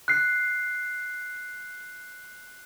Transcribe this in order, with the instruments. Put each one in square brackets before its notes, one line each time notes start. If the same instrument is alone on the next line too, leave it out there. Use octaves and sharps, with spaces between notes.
[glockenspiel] F#6 C7